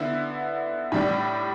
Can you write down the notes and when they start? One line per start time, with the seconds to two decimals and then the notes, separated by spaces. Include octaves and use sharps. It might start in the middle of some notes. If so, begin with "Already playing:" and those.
Already playing: D3 B3 E4
0.92 A2 G3 D4